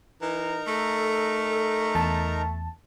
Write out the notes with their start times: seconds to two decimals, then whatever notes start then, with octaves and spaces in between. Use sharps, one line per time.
0.22 E3 D#4 A#4 A#5
0.67 A3 A4
1.95 E2 A5